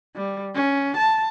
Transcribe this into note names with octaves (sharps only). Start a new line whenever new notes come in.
G3
C#4
A5